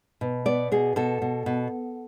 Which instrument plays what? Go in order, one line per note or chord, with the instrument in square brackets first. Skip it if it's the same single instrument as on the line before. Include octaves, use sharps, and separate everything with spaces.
[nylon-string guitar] B2
B3 D5
B2 G#4
B2 A4
B2
B2